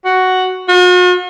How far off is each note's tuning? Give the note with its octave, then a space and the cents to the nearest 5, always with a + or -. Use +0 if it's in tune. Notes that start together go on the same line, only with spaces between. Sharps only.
F#4 +5
F#4 -45